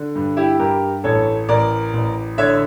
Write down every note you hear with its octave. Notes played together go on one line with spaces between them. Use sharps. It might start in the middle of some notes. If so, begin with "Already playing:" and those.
Already playing: D3
G2
E4 G4
G2 G4 A#4
A1 A4 C#5
A1 A#4 D5
A1
D3 C#5 E5